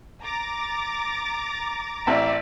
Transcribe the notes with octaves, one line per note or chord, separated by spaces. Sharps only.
A#5 D6 A6
A1 C4 D5 E5